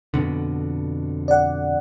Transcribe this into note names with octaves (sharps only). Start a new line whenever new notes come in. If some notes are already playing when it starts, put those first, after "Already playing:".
F2 B2 D3
D5 F#5